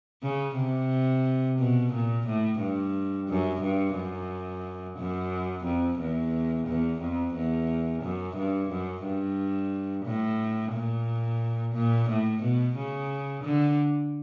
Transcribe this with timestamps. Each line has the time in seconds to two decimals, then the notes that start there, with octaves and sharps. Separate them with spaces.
0.23 C#3
0.57 C3
1.59 B2
1.92 A#2
2.27 A2
2.60 G2
3.28 F#2
3.62 G2
3.95 F#2
4.98 F#2
5.64 F2
5.99 E2
6.67 E2
7.01 F2
7.35 E2
8.02 F#2
8.36 G2
8.70 F#2
9.04 G2
10.05 A2
10.73 A#2
11.74 A#2
12.09 A2
12.42 B2
12.76 C#3
13.44 D3